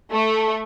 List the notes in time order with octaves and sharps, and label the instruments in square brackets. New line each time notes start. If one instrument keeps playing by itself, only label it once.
[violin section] A3